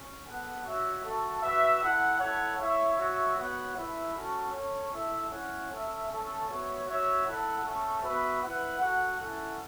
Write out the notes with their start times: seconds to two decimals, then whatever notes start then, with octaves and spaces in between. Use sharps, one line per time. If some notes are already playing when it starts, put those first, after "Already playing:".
Already playing: C#4
0.25 B3 A4 F#5
0.64 F#4 C#5 E5
1.03 A3 F#4 A4
1.41 F#4 B4 E5
1.80 E4 A4 F#5
2.19 E4 A4 C#5 F#5
2.58 E4 C#5 E5
2.96 F#4 C#5 E5
3.36 B3 F#4 C#5 F#5
3.75 A3 E4 B4 E5
4.13 C#4 F#4 A4
4.52 C#4 A4 C#5
4.91 A3 E4 A4 E5
5.30 C#4 E4 C#5 F#5
5.69 C#4 A4 E5
6.08 A3 C#4 A4
6.47 B3 F#4 C#5 E5
6.85 F#4 C#5 E5
7.25 E4 A4 F#5
7.63 A3 C#4 A4
8.02 B3 F#4 B4 E5
8.41 E4 B4 F#5
8.80 F#4 A4 F#5
9.18 C#4 E4 A4 F#5